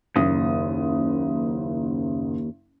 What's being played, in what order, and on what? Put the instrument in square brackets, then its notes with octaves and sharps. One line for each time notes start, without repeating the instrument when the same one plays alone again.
[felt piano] F#1 D#6 [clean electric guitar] D#2